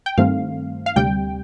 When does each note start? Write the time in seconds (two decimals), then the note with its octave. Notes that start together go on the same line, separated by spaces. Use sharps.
0.06 G5
0.18 G2 D#3 A3 C4 F5
0.86 F5
0.96 D2 C3 G3 G5